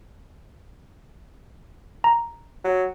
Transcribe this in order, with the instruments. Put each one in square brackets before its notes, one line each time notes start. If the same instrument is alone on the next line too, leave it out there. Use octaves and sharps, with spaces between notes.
[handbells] A#5
[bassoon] F#3